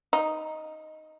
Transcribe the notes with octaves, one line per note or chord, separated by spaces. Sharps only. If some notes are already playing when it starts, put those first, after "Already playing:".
D#4